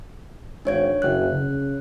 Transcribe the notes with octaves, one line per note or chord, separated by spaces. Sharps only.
G#1 D4 C#5 G#6
F#1 F#6
C#3